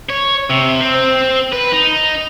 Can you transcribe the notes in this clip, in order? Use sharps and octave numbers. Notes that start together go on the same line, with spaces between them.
C#5
C3
C4
B4
D#4